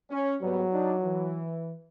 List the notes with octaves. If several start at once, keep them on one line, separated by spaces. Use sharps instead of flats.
C#4
G#2 F#3 G3 B3
D4 D#4
E3